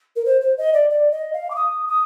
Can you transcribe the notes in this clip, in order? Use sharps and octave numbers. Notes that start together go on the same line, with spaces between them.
A#4
C5
C5
D#5
D5
D5
D#5
F5
D6
D#6
D#6